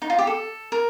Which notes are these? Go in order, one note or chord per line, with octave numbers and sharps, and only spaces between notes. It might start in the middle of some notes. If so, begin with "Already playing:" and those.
D#4
F4
G4
A4
A#4